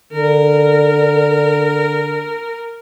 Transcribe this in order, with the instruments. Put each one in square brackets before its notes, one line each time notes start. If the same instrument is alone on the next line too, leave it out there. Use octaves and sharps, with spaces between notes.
[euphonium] D3 [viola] A#4